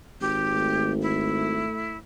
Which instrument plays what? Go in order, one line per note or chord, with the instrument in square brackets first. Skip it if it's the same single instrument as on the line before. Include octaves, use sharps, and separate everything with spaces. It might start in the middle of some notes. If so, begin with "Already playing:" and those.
[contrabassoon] G#1 [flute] G4
[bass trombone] A3
[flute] E4